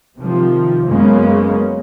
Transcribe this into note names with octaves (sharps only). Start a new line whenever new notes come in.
C3 D#3 F3
F#2 C#3 G#3 A#3 B3 C#4